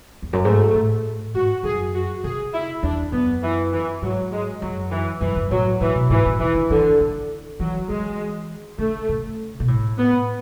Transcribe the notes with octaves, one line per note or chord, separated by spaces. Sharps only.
E2
F#2
G#2 A3
A2
G#2 F#4
F#2 G#4
F#4
C#3 G#4
E4
E2 D4
F#2 B3
E3
E3
G#2 F#3
G#3
F#2 F#3
E3
F#2 E3
F#2
A2 F#3
A2 E3
B2
A2 E3
C#3
C#3 E3
D3
D3 E3
D3
E3 F#3
E3 G#3
D3 A3
C#3
B2
A2
B3